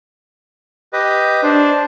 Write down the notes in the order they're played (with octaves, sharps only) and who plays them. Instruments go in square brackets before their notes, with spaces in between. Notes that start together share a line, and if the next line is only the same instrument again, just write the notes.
[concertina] G4 B4 D#5
[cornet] D4 [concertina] C5